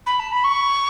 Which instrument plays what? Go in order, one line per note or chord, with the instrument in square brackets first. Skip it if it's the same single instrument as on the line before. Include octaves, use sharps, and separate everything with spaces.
[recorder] B5
A5
B5
C#6